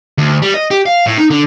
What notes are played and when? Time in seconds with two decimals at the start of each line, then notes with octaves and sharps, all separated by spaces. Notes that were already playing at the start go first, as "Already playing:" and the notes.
0.18 D2
0.42 G3
0.54 D#5
0.71 G4
0.86 F5
1.06 A2
1.18 D#4
1.30 D3